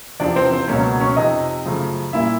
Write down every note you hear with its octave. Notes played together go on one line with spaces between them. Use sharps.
E2 C3 F3 D4 D5
C4 C5
C4 C5
C#2 B2 F#3 A#3 C#4 C#5
C#4 C#5
F2 C3 F3 D#4 D#5
F#2 C#3 F3 A3
A#2 G3 A#3 E4 E5